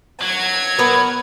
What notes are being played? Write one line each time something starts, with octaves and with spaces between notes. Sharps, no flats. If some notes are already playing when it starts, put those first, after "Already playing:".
F#3 G#6
B3 A#4 B5